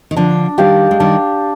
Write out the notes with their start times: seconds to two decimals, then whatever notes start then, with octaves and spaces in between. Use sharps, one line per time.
0.11 D#3
0.16 D3 F3 D4
0.58 D#3 G3 G4 D5 F5
0.91 G#3
1.00 D#3 G3 D4